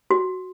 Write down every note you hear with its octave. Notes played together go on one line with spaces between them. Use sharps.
F#4